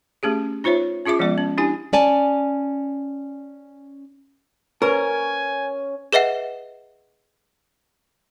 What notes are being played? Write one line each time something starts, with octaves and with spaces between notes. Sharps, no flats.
A3 C#4 G4 G#4
D#4 F4 C5 C#5 E5
C#4 F4 G#4 E5 D6
F3 G#3 B3 D5
C#4
D4 E4 G4 G#5
C#4 D5 G#5 A5
C#4 A#4 B4 G#5
G#4 B4 D#5 E5 F#5